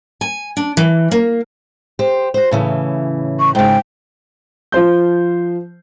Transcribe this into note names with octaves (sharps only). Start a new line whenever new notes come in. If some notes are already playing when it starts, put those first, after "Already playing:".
G#5
D4
E3
A#3
G4 C5
F#4 C5
A2 C#3 E3
C#6
G#2 C#3 G5
F3 F4 C5 G6